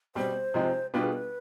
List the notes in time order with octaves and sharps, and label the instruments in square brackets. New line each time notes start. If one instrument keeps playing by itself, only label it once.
[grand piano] B2 G3 C4 [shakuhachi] C5
[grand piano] C3 F3 G#3 C4 D#4
[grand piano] B2 G3 B3 D4 F4 [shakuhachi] B4
[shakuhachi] G#4
B4